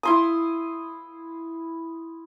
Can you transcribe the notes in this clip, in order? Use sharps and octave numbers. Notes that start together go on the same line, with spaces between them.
E4 C6 D#6